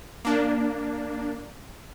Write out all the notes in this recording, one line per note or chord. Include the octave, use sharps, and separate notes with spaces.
A#3 D4